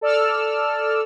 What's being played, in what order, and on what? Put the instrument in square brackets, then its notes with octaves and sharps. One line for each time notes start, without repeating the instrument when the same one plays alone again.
[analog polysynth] A4 D5 E6 F6